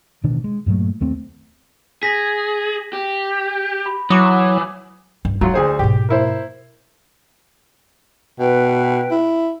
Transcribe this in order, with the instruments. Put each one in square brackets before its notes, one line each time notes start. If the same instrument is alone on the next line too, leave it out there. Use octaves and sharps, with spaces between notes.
[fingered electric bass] A1 B2 D#3 D4
G#3
G2 A#2 F#3 A3
D#2 A3 C4
[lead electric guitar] G#4 [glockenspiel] A#6 B6
[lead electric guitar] G4
[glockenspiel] B5
[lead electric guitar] E3 [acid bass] F#3 [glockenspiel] D6 D#6
[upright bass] G2
[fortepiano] F#3 F4 [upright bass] D#4
[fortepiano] D2 G#4 C5
[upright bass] G#2 B2 [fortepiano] G4
[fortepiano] A#3 E4 C5
[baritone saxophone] B2 [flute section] B4 G5
[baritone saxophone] E4